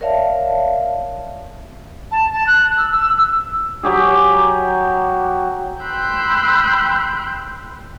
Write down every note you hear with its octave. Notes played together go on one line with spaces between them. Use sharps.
A#4 C#5 D5 E5 F5 A5
A5
A5
F#6
E6
E6
E6
F#3 G4 G#4
G5 B5 C6 E6 F#6 G6